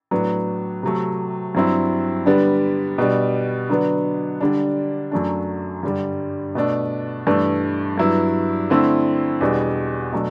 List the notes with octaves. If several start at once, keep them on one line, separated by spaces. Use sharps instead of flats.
A2 F#3 B3 D4
C3 F#3 A3
G2 F#3 C4 E4
D3 G3 B3 D4
B2 G3 D4
D3 F#3 B3 D4
D3 G3 D4
F#2 F#3 A3 D4
G2 D3 G3
B2 A3 D4
G2 E3 A3 D4
G2 F#3 B3 E4
D3 A3 C4 E4
E2 B2 G3 D4
B2 F#3 A3 D4